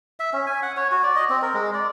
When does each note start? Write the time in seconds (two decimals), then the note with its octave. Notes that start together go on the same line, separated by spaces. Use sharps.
0.20 E5
0.33 C#4
0.47 G#5
0.63 F#5
0.77 C#5
0.92 F#4
1.04 D5
1.16 D#5
1.30 C4
1.42 A#4
1.54 G#3
1.74 D5